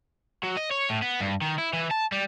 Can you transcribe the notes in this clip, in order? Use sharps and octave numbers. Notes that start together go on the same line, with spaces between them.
F#3
D#5
C#5
A2
B3
G2
D#3
E4
E3
A5
G3